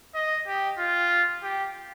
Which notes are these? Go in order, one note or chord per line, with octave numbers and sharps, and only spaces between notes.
D#5
G4
F4
G4